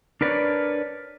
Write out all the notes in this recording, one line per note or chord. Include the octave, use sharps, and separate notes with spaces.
D4 A#4 B4 C#5 D5